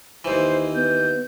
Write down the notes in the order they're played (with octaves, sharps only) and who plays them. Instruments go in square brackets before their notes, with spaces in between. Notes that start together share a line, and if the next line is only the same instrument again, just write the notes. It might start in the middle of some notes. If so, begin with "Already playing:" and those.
[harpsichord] D#2 E3 [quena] C5
[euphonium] B3 [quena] G6